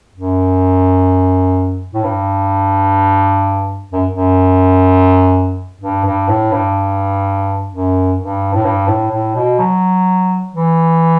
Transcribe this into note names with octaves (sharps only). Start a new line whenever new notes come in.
F#2
A2
G2
F#2
F#2
G2
G2
A2
G2
F#2
G2
A2
G2
A2
A2
B2
F#3
E3